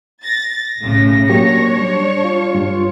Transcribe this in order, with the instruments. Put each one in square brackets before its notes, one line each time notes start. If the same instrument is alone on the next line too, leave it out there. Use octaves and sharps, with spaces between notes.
[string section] A6 [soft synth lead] A#6
[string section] B1 A2 C#3
[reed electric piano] F#3 A#3 G4 [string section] D4 C#5 C#6
[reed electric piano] G3
[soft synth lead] F4
[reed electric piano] G2